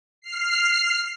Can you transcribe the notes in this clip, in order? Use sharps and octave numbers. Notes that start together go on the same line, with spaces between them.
F6 C7